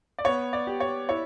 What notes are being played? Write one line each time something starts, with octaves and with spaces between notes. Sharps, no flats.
D5
B3 C#5
D5
G4
C#5
E4 C#5